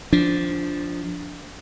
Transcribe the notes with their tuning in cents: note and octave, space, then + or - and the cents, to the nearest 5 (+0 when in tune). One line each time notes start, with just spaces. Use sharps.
F3 +0 D4 -15